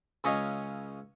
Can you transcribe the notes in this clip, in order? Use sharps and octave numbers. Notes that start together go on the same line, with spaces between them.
C#2 C#4 C#5 D#5 F5